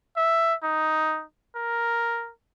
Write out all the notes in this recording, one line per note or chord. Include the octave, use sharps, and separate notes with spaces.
E5
D#4
A#4